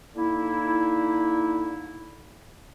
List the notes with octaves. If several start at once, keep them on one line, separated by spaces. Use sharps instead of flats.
D3 A#3 D#4 E4